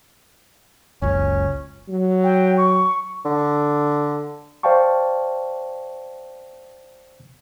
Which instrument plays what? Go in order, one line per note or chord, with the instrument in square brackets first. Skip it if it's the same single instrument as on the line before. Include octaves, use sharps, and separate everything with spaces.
[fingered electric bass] F#1 C#2 F#2 [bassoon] C#4
[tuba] F#3
[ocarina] G5
C#6
[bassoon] D3
[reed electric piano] C5 D5 F5 G5 A5 C#6